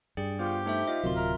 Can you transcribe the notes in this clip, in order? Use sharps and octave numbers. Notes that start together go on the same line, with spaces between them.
G2 G#4 D5 G5
B3 F4 G4 C5
A3 D#4 C5 E5
F4 D#5
D1 C3 F#3 F4 A#4 C6
A#4 E5